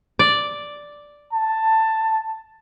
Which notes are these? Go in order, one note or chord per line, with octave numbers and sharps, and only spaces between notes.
D5
A5